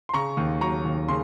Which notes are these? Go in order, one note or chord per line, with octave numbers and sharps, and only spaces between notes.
C6
C#3 A#5 C#6
D#2
F#3 A#5 C#6
D#2
C#3 C6